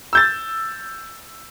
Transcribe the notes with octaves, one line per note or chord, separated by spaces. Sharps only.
E6 G6 A6